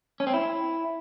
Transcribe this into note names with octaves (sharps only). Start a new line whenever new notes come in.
C#4
C4
E4